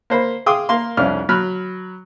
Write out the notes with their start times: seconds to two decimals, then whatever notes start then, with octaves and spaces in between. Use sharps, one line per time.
0.10 A#3 C5 B5
0.46 G#4 F5 G5 C6 D6 D#6
0.69 A#3 A#4 F5 C6
0.97 C2 F2 C#4 D4 F6
1.29 F#3 B5 F6 F#6